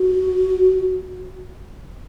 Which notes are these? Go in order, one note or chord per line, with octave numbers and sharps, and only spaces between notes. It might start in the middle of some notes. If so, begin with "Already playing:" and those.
Already playing: F#4